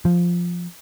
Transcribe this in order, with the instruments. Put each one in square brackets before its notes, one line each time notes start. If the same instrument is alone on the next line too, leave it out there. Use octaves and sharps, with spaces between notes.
[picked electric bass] F3